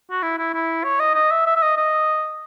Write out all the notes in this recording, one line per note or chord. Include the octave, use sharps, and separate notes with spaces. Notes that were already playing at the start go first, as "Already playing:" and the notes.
F#4
E4
E4
E4
C#5
D#5
D#5
E5
E5
E5
D#5
D#5